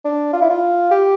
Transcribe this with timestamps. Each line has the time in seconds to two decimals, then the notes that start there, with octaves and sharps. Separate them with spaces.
0.05 D4
0.33 F4
0.42 E4
0.50 F4
0.91 G4